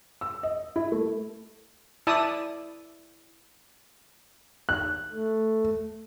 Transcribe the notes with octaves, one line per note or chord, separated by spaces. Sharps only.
E6
D#5
E4
A3
E4 D5 A5 B5 D#6 E6
F#6
A3